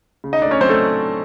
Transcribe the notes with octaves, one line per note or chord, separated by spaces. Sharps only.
C#3
D#4 D#5
A3 D4 D5
C#4 C#5
F#3 C4 C5
A3 A4